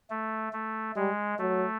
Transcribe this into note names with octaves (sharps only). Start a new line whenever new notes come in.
A3
A3
G3 G#3
F#3 A3